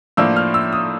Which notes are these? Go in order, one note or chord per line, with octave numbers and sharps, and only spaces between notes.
A2 F3 A#3 D4 E6
F6
E6
D#6